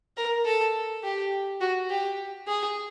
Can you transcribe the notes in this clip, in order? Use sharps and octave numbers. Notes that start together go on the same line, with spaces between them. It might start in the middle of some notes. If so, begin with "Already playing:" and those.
A#4
A4
G4
F#4
G4
G#4